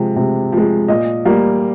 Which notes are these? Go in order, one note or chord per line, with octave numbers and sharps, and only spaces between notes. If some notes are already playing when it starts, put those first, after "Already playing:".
Already playing: C3 F3 G#3
C3
F3
G#3
A#2 D#5
G3 A#3